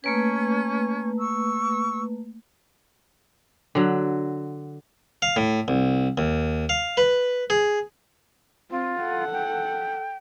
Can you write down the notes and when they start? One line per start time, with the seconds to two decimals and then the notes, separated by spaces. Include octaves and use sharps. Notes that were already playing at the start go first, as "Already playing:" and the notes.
0.04 A3 A#3 C#4 B4 C#6 G#6
1.19 C#6 E6
3.75 D3 F#3
5.22 F5
5.36 A2
5.68 C2
6.18 D#2
6.69 F5
6.97 B4
7.50 G#4
8.71 C4 F4
9.00 A4 F#5
9.33 G5